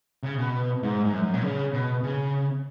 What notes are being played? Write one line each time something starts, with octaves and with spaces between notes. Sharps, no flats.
C#3
B2
G#2
G#2
F#2
F#2
A#2
C#3
B2
C#3